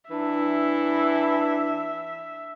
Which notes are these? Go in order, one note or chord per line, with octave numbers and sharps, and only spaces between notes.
E3 D4 E5